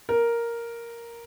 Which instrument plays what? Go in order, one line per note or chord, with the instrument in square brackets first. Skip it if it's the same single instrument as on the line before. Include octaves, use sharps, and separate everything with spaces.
[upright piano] A#4